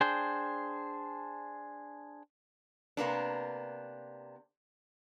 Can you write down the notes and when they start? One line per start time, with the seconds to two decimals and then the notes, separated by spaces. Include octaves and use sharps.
0.01 D4 G#4 C5 G5
2.97 C3 A#3 B3 D4